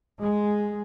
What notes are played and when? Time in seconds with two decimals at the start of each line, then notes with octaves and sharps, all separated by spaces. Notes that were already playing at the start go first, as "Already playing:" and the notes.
0.20 G#3